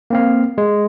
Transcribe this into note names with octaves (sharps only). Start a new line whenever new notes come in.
A#3 C4 F5
G#3